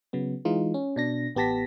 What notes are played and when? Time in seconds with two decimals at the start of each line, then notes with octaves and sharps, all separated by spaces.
0.13 C#3 F#3 B3
0.45 E3 G#3 D#4 F4
0.74 C#4
0.96 B2 D4 A#6
1.35 A1 B3 G4 A5 A#6 B6